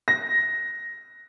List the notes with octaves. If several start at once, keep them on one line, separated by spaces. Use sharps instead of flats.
A#6